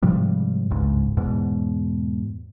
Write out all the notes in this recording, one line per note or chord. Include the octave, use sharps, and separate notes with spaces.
G#2 C3 F3 G3
G1 C#2 G#2
E2 G#2 B2